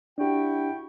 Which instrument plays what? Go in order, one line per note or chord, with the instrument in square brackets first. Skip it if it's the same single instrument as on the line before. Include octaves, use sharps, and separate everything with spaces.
[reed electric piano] D4 G4 [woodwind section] E4 F#4 G5